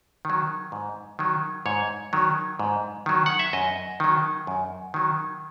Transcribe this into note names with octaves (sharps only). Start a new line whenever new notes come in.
D#3 F#3
G#2
D#3 F#3
G#2 C#5
D#3 F#3
G#2
D#3 F#3
F#5
E5
F#2 D#5
D#3 F#3
F#2
D#3 F#3